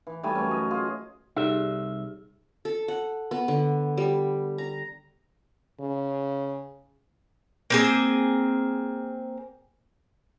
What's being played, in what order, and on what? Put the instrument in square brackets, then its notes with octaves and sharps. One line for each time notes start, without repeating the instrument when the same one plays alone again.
[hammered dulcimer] E3
G3 A3 E4 G#5
F#2 C#4
D#5
F4 G#4
[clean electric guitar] C2 E5 [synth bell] D#4 G4 G#4
[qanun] A4
F#5
B3
D3
G3
A#5
[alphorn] C#3
[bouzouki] A#3 C4 G#4